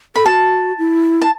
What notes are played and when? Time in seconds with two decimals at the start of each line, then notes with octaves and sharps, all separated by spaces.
0.15 A4 B5
0.26 F#4 A5
0.79 E4
1.21 A5